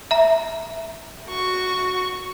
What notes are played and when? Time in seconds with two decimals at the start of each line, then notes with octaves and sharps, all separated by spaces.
0.11 E5 A#5
1.28 F#4 C#6